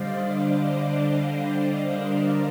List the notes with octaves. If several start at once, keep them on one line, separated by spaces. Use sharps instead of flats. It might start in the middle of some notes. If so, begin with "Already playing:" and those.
Already playing: D3 G3 D4 C5 D5 D#5 F5
C5 D#5
A#4 D5